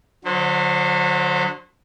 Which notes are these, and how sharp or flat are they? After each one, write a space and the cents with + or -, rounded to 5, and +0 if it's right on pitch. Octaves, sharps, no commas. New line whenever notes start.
D3 +0 F#3 -35 C5 +0